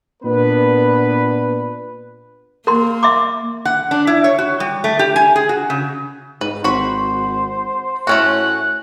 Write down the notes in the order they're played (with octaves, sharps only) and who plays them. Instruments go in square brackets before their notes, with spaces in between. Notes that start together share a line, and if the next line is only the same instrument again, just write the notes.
[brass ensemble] A#2 B3 D4 B4
[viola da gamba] A#3 [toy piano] A#4 C6
[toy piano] E5 C6 D6
[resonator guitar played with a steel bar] F#5
D4
E4
C#5
F#4
G3
A3
G4
G#5
G#4
F#4
C#3
[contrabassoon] G#2 [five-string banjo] B4
[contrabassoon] G#1 [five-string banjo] F#4 B5 [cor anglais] C5
[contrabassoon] A2 [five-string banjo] A3 C#4 F#4 [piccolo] F#6